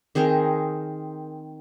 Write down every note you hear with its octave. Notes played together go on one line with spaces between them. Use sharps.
D#3 C4 G#4 A#4